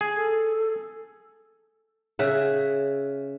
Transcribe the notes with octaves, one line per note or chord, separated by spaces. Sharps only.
G#4
A4
C#3 G#4 E5 F#5